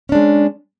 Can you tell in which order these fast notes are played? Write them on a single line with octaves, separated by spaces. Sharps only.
C#4 D4 G#3